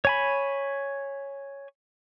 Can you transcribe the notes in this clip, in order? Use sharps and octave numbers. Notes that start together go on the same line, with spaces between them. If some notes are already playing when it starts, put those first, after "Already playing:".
C#5 G#5 B5